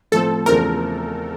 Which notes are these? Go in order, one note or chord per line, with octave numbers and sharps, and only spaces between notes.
A2 F3 A3 C4 A4
E2 C#3 F3 A3 C4 A#4